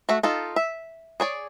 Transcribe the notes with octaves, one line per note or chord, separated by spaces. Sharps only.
A3 F#4
D#4 F4 A4
E5
G#4 C#5 D5